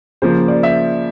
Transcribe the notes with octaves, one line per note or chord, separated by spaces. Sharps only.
C#3 F3 A#3 C5
D5
E5